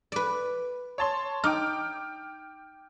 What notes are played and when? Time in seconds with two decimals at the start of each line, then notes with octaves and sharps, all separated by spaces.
0.12 B4 D5
0.98 C#5 A5 C6
1.44 D#4 G5 D6 F6